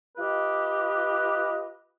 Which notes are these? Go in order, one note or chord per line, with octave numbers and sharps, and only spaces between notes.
F4 G4 B4 D#5